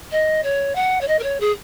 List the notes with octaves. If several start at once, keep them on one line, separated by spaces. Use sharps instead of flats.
D#5
C#5
F#5
C#5
D#5
A#4
C#5
G#4